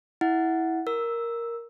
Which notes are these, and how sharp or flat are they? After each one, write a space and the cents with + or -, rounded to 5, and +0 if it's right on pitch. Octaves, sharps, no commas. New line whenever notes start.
E4 -15 F#5 +0
A#4 +0 E6 +0